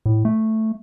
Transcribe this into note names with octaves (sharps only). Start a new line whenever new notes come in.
A2
A3